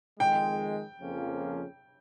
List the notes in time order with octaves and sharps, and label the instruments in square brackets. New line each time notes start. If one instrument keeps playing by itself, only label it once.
[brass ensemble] F2 D#3 G#3 [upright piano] G5
[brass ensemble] F2 C#3 F3 A#3 C#4